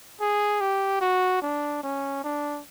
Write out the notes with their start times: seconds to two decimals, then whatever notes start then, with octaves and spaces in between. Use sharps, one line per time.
0.21 G#4
0.61 G4
1.01 F#4
1.42 D4
1.84 C#4
2.24 D4